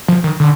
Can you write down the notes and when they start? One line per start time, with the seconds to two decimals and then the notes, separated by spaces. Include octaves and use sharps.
0.08 F3
0.24 D#3
0.40 D3